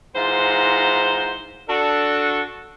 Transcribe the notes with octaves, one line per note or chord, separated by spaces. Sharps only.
G#2 E3 F4 C5 F#5 A#5
D4 F#4 A4